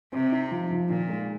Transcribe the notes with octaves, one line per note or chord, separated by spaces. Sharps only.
C3 C4
D#4
F3
F3
A#2 D#3
G#3